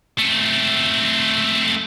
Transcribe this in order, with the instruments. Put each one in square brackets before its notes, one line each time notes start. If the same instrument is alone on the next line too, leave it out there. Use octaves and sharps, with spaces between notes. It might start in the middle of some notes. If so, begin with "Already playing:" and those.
[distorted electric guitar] A3 C4